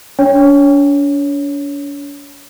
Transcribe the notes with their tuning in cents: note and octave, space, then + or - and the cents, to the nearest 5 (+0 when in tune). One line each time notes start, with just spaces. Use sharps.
D4 -45 C#5 +0